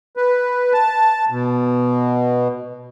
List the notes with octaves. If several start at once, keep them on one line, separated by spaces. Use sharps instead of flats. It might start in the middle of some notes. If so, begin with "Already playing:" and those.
B4
A5
B2